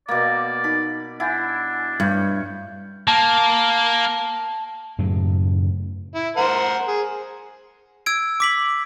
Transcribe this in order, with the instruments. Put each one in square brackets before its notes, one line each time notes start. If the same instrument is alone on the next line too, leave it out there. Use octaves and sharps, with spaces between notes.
[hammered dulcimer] B2 A#3 [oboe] D5
[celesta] D#4 [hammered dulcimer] B5
[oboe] D4 [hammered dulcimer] E4 [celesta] F#5 G#5 G6
[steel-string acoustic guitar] G2 [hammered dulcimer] C#5 [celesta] F6 G6
[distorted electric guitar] A#3 [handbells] A5
[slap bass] F#2 A2 C#3
[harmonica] E4
A#4 C5 F#5
G#4
[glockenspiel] E6 G#6 D7
D6 B6 F#7